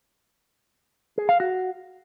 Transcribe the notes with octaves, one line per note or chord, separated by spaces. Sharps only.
G#4
F5
F#4